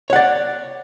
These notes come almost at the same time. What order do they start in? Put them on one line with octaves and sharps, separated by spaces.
C#5 F#5 D5